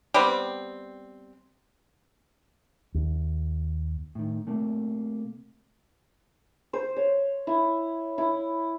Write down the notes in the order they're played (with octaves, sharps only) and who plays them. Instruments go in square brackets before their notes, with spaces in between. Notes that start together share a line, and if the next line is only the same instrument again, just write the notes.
[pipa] G3 B3 C4
[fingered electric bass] D#2
[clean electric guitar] A2 D#3
C3 A3 A#3
[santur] C5
C#5
E4
E4